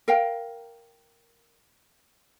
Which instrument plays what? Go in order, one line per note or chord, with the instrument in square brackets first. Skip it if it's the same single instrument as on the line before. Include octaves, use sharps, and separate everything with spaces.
[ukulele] A#4 F5 G5